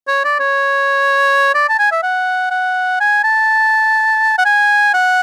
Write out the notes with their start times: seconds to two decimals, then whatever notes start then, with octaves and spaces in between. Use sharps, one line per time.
0.08 C#5
0.25 D5
0.40 C#5
1.54 D5
1.69 A5
1.79 G#5
1.92 E5
2.03 F#5
2.51 F#5
3.00 G#5
3.24 A5
4.38 F#5
4.45 G#5
4.94 F#5